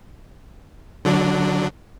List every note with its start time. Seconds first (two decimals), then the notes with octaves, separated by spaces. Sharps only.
1.05 D3 F#3 D4